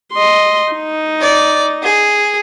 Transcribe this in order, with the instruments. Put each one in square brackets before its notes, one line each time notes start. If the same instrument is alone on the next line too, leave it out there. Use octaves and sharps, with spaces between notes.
[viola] D#5 C6
D#4
[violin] D5
G#4